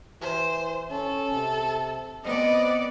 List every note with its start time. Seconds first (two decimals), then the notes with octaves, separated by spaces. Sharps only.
0.21 E3 C5
0.91 C#4 A4
1.33 C3
2.24 B3 C4 D5 D#5